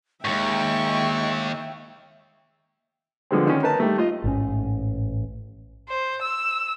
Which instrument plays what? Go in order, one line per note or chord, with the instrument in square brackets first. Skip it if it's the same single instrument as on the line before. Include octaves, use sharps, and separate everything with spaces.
[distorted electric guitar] D#2 G#2 [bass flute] G#3 [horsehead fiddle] E5 G5 [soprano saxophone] C#6
[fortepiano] D3 F3 G#3 B3 C4
D#3 C#4
D#4 A#4 B4 A5
G3 A3
F4 D#5
[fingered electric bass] A1 G#2 C#4
[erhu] C5
E6